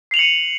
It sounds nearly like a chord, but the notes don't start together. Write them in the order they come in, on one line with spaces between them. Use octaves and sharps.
C7 F7 F#7 C#7 D#7